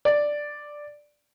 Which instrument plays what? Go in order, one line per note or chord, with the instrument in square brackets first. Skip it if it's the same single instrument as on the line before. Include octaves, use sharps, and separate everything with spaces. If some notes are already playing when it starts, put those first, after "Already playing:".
[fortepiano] D5